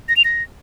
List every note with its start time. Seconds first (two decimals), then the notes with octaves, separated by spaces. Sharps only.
0.09 A#6
0.17 F7
0.24 A#6